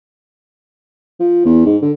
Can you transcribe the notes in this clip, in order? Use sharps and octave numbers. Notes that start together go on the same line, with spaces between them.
F3
E2
G#2
D3